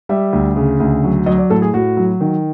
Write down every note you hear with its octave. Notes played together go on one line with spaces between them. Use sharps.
G3 E5
D2
C#3
D2
F#3
F#3 D#5
D5
A2 A4
G#4
A2 F#4
F#3
D#3